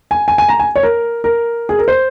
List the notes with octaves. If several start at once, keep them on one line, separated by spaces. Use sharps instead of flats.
G#5
G#5
G#5
A#5
G#5
C#5
A#4
A#4
G#4
A#4
C5